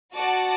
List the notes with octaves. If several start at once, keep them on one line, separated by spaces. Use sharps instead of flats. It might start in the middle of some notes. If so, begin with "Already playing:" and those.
F#4 D5 F#5 A5